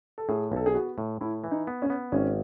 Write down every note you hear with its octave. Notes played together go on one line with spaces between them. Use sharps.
A4
A2 G#4
B1 A4
G#4
B3 F#4
A2
A2 E4
E3
D#4
B3
C#4
B3
G#1 C#4